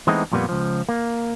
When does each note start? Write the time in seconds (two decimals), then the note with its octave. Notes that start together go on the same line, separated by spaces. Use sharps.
0.07 E3 G#3 A3 B3 C4 D#4
0.32 F2 A#2 G3 A#3 B3
0.49 C#2 F3
0.89 A#3